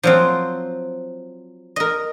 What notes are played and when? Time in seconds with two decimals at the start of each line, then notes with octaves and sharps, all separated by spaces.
0.03 F3 F#3 C4
1.76 A#4 D#5